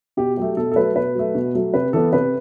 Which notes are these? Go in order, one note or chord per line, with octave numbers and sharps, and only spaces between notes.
B2 G4
F#3 A3 G4
B2 A4
A4
F#3 A3 B4
B2 B4
F#3 A3
B2
F#3 A3
C3 B4
E3 B3 A4
C3 B4